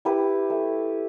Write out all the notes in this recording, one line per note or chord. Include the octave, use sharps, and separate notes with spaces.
E4 G4 B4
A3